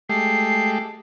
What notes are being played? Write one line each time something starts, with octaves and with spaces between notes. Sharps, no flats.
G#3 A3 G4 C7